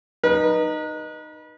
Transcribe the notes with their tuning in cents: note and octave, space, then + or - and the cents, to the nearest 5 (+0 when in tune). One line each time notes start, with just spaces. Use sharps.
D#4 -15 B4 -35